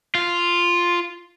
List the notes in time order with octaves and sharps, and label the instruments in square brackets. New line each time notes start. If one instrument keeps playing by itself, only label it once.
[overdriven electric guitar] F4